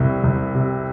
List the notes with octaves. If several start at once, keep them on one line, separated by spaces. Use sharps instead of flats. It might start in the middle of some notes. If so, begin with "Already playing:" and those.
Already playing: C2 C3 E4
C2
C3